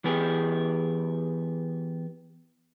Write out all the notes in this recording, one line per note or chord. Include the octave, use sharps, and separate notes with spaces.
E3 B3 G4 G#4